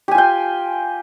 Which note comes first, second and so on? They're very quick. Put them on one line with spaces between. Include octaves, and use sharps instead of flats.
G4 G#5 F4 G5